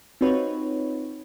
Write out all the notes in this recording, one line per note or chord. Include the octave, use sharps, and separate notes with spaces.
C4 D#4 F4 F#4 B4 C#5